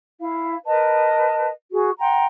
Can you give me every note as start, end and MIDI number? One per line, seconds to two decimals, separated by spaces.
0.19 0.56 64
0.19 0.56 77
0.66 1.48 70
0.66 1.48 71
0.66 1.48 75
0.66 1.48 81
1.72 1.91 66
1.72 1.91 68
1.99 2.25 78
1.99 2.25 79
1.99 2.25 82
1.99 2.25 84